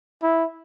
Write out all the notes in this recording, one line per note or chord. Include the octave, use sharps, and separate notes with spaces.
E4